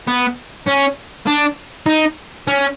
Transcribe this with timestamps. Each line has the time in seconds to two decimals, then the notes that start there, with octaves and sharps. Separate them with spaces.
0.07 B3
0.67 C#4
1.27 D4
1.86 D#4
2.47 C#4